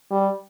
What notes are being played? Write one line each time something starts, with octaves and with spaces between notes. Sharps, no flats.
G3